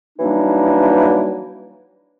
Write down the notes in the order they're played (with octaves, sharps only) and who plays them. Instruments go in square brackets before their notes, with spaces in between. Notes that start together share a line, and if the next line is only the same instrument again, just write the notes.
[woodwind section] E3 F#3 G3 A#3 D4 D#4